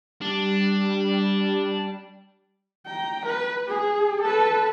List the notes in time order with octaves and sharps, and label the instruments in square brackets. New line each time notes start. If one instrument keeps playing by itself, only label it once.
[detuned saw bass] G3 [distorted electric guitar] D4
[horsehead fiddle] G5 A#5
B4
G#4
A4 B4